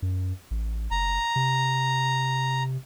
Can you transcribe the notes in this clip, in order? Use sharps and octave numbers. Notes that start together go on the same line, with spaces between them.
F#2
A1
F#1 A#5
C3